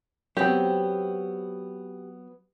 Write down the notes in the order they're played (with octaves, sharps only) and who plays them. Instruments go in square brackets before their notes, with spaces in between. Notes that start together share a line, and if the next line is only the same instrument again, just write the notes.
[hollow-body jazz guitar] F#3 B3 C4 [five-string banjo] G4